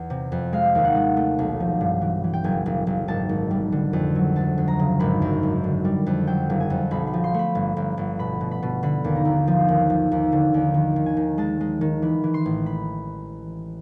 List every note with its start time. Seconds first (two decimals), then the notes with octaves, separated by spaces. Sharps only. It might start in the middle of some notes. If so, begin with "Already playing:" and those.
Already playing: E2
0.10 C3
0.32 F2
0.53 G#3 F5
0.75 D#2
0.85 F#5
0.95 G#3
1.17 A3
1.39 B1
1.60 F3
1.81 G2
2.02 E3
2.24 E3
2.33 G5
2.44 F#1 G#5
2.66 F#1
2.87 F#1
3.08 G#1 A5
3.29 G#1
3.51 G3
3.72 D3
3.93 F2
4.15 F#3
4.36 D2 A5
4.58 D2
4.68 A#5
4.79 C#3
5.00 G#1 B5
5.22 F#2
5.43 G#1
5.64 D3
5.85 G3
6.06 F2
6.27 F#3 G5
6.50 F#1
6.60 G#5
6.70 F2
6.91 B1 B5
7.07 B5
7.14 F3
7.24 C6
7.34 A3 B5
7.55 G1
7.77 G1
7.97 G1
8.19 B2 B5
8.41 B2
8.51 B5
8.63 B2
8.83 D3 B5
9.04 D#2
9.16 A#5
9.25 D#2
9.47 F3
9.68 D#2
9.90 F3
10.12 D#2
10.32 D3
10.54 D#2
10.74 D#3
10.96 D#3
11.06 G#5
11.17 D#3
11.38 G#3 A5
11.60 G#3
11.81 D#3
12.02 E3 B5
12.24 E3
12.34 C6
12.46 A1
12.66 B5